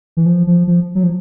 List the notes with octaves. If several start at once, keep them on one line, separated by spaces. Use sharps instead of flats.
E3
F3
F3
F3
F#3
F3